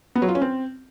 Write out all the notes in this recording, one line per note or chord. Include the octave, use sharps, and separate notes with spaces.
B3
F#3
F4
C#4
C4